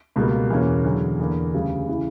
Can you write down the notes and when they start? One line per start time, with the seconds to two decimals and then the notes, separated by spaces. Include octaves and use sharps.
0.16 C#2 B2 G3 A#3
0.50 E2 B2 A#3 C#4
0.84 E2 D3 F#3
1.20 E2 D3 A#3
1.53 D2 C#3 G3
1.89 C#3 E3